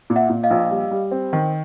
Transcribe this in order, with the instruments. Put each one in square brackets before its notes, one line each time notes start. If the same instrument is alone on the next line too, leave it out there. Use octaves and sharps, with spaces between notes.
[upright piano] A#2
[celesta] E5 F#5
[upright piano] A#2
[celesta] D#5 F5
[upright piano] A#1
G3
G3
C4
D#3